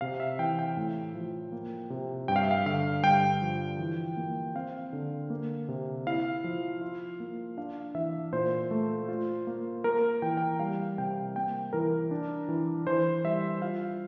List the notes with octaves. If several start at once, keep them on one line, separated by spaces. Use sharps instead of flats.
C3 F5
E5
E3 G5
G5
A2
F3
A#3
C3
G2 G5
F5
E5
F5
D3 F5
G2 G5
F3
E3
A#3
C4 F5
D3
A#3
C3
E4 F5
F3
F4
A#3
D4 F5
E3 E5
A#2 C5
A3
F4
A#3
A#3 A#4
E3 G5
G5
G3 F5
C3 G5
A#3 G5
E3 A#4
D4
E3
E3 C5
G3 E5
F4 F5